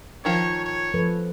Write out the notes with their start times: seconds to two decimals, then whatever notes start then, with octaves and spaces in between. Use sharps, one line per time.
0.25 D#3 F3 C#5
0.64 C#5
0.94 F3 A4 B4